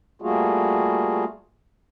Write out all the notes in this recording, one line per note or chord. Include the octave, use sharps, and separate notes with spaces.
G3 A3 A#3 F4 F#4 G#4